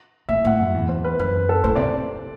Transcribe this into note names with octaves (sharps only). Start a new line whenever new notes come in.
A2 E5
A2 F#5
F#2 E5
E2
C5
B4
F#2 B4
A4
A2 C5
C3 D5